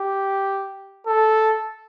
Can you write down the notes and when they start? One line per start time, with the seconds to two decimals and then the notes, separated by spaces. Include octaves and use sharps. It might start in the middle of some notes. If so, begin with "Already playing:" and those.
Already playing: G4
1.07 A4